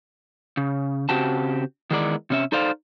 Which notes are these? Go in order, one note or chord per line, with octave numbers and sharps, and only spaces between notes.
C#3
C#3 C4 F#4 G4 A5
D#3 E3 G#3 B3 A#4 D5
C3 C#4 E5
D#4 A4 C5 D5 F5